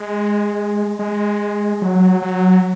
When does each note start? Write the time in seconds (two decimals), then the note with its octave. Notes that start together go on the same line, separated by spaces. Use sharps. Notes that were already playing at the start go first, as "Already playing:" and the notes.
Already playing: G#3
0.99 G#3
1.82 F#3
2.22 F#3